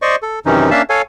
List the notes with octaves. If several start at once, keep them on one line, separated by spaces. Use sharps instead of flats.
C5 D5 D#5 C#6
A4
F#2 C3 D#3 E3 C#4 D#4
A#3 C#4 D4 E5 F5 A5
A4 C#5 F5 G#5